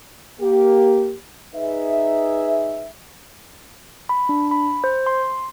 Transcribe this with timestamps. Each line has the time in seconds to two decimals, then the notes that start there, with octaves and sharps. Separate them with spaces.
0.40 A#3 G4
1.55 D#4 G#4 B4 E5
4.09 B5
4.29 D4
4.51 B5
4.84 C5
5.06 C6